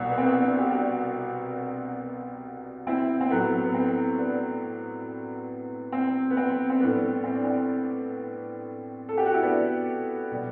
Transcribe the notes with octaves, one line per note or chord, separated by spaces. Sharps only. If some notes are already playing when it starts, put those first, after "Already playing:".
Already playing: C2 B2 G3
B3
C4
B3
B3 D4
G4
D4 F#4
C4 E4
C4
A2 F#3 B3
B3
C4
B3 D4
C4
B3
C4
C4
A2 G3 B3 D4
C4
D4
C4
A4
G4
F#4
E4
B3 D4
B2 G3